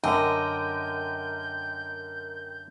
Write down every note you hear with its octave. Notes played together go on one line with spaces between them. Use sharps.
F#2 D3 A#4 D#5 G5 G6